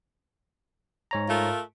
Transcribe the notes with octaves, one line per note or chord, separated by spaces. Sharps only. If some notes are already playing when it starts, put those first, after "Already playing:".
G#2 C#5 A#5
A3 F4 A#4